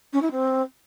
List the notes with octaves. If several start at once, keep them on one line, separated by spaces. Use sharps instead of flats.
C#4
E4
C4